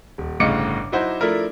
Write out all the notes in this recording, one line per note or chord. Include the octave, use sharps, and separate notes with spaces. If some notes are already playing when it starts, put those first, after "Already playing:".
D#1
G1 A2 C#3 D#5 D6 C#7
F#3 D#4 E4 F#4 C5
F3 A3 D4 E4 A#4